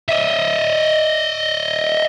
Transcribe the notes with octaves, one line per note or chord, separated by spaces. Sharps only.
D#5 E5